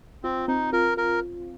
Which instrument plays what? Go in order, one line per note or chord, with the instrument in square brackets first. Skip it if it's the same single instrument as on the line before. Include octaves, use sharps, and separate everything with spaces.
[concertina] C4 [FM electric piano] F4
[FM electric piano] C4 [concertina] D#4
[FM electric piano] F4 [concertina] A#4
[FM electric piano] F4 [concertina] A#4